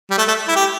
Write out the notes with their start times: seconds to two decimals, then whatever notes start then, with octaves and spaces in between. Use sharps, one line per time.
0.11 G3
0.18 A3
0.28 A3
0.48 E4
0.56 G4